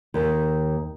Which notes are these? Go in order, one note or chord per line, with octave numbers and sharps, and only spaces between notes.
D#2